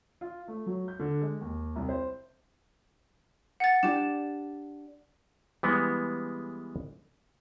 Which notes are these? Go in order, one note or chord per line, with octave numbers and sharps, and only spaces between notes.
F4
A3
F#3
G6
D3
G#3
D#2
C2
C5
F#5 A6
D4 G4 D5 E7
E3 G3 G#3 B3